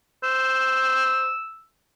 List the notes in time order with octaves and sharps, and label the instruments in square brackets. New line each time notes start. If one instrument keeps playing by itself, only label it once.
[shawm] C5 [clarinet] E6